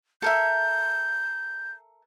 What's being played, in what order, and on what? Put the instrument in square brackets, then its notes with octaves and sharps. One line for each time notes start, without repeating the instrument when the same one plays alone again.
[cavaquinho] A4 A#4 E5 [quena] G6